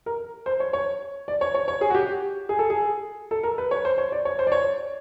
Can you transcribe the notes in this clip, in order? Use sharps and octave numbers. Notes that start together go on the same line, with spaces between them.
A#4
C5
C#5
C#5
D5
C#5
C#5
C#5
G#4
F#4
G4
G#4
A4
G#4
A4
A#4
B4
C#5
C5
C#5
D5
C#5
C5
D5
C#5